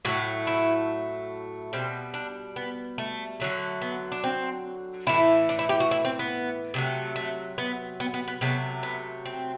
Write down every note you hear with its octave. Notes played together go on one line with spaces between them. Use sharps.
A2 F#3 A3 F#4
E4
B2 G3 C4
D4
B3
A3
D3 F#3 A3
B3
D4
C4
A2 E3 A3 E4
D4
E4
G4
F#4
E4
C4
B3
C3 F#3 A3
A3
B3
B3
B3
B3
C3 F#3 A3 B3
B3
C4